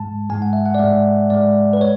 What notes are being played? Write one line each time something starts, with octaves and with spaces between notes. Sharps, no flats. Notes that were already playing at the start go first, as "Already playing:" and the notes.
Already playing: G#2 G#3 A5
G#2 G#3 G#5
F#5
E5
F#5
D5
G#2 G#3 E5
G#2 G#3 D5
B4
C#5